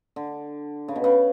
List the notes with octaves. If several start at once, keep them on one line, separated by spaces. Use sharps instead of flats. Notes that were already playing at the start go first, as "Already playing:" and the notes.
D3
C#3
B2
C#3